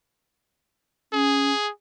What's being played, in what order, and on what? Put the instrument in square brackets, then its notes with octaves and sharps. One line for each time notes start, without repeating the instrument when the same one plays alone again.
[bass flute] C#4 [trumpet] G#4